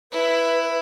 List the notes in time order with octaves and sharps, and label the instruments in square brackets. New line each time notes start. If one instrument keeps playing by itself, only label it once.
[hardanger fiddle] E4 [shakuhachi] B4